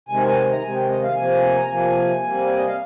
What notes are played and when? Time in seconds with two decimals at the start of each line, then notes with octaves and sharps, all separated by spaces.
0.09 C3 D#3 G#3 G#5
0.26 G#5
0.52 A#5
0.62 C3 D#3 G#3 G#5
0.75 G5
0.89 D#5
1.02 F5
1.15 C3 F3 A#3 G#5
1.58 A#5
1.69 C3 F3 A#3 G#5
2.22 C3 G3 A#3
2.46 D5
2.56 D#5
2.66 F5